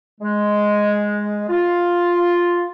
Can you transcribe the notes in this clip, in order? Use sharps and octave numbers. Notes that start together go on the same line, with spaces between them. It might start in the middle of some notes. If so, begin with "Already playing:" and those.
G#3
F4